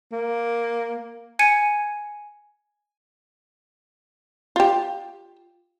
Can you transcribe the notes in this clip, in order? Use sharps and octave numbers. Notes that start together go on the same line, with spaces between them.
A#3
G#5 G#6 C#7 D#7
F4 G4